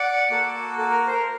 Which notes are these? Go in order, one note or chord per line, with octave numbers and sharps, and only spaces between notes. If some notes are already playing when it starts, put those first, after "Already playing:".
Already playing: D5 F#5
A#3 F#4 A4
A4
A#4
C5
A#4